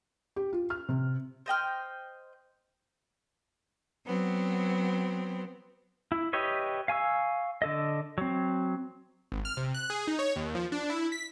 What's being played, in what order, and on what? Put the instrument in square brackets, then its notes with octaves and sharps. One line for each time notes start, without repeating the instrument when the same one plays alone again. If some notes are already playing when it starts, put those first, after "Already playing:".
[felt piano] G4
F4
F6
C3
[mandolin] C5 D#5 G5 F6
[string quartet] F#3 B3 C4
[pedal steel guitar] E4
G4 B4 C#5 D#5 E5
F5 G#5 C#6 E6
D3 A4 D#5
F#3 C4
[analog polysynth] G#1
F6
C3
F#6
G#4
D#4
C#5
D#2
F3
D4
E4
B6